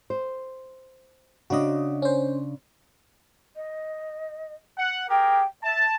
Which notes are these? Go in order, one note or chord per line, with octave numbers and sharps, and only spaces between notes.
C5
C#3 D4 F#4 D#5
C#4 C5
D#5
F#5
G4 G#4 A#4 G5
E5 A5